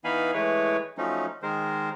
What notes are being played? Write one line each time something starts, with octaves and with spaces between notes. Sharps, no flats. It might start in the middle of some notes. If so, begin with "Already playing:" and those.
E3 B3 D#4 F5 G#5 B5
E3 G#3 A3 E4 B4 C#5
F3 F#3 A3 C#4 D#4
D#3 G#3 A#4 C5